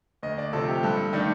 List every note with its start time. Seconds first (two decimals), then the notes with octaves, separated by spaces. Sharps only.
0.22 D2 D#5
0.38 D5
0.53 C3 F3 C4 A4
0.68 G4
0.83 G2 A4
1.13 D#3 A3 D4